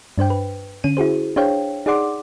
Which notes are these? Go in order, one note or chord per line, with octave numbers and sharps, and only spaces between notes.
G2 D4 C5 G5
B4
D3 C#4 D#7
E4 F#4 G#4 C5
D4 G#4 C5 C#5 F5 G5
D#4 G#4 D5 F#5 C6 D6